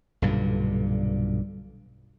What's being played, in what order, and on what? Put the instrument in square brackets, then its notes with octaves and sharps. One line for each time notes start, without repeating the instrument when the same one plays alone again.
[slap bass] B1 G2 A#2 D3